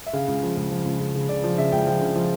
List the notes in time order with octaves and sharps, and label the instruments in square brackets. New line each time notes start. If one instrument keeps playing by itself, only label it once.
[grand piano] E5
C#3 F5
C#2
F3
C#2
F3
C#2
C#2
C#3
C#3 D5
F3
C#3 E5
C#2 G5
F3 G5
C#3
F3